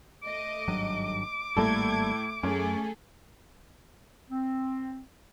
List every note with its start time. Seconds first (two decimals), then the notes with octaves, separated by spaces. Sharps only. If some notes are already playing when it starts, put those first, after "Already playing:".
0.23 A3 D#5 D6
0.68 G#1 G2 F#3
1.57 G#1 A2 G3 A#3 A4 G#6
2.43 F#2 A3 C#4 G#4 A4
4.29 C4